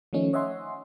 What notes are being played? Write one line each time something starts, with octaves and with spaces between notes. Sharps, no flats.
D#3 F3 A3 C#4 D#4
C#5 D#5 E5 F#5 G#5 C6